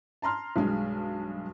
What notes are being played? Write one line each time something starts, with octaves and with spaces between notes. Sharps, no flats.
A5 A#5 C6 F6
B1 G2 G#3